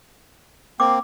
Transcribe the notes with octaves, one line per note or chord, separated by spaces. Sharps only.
A#3 C4 D6